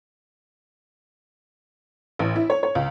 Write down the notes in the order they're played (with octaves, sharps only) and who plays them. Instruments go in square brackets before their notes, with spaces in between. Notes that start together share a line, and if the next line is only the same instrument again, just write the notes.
[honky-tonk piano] A1
E4
C#5
C#5
C#2